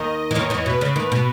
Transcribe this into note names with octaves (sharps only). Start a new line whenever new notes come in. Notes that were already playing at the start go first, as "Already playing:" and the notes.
Already playing: D#2 D#3 D#5
E3
D#2 D#3 C#5
E2 E3
B2 B4
C#3
D#2 D#3
B2